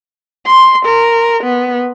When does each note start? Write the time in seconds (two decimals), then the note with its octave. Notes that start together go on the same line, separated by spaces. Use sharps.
0.46 C6
0.86 A#4
1.44 B3